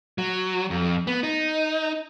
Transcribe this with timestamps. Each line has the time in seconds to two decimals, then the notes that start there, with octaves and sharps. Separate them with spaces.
0.18 F#3
0.70 F2
1.07 B3
1.23 D#4